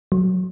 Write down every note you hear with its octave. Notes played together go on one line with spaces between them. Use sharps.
F#3